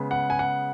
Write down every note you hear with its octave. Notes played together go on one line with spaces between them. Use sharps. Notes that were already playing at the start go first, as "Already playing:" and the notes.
Already playing: C#3 G#3 B3
F#5
G#5
F#5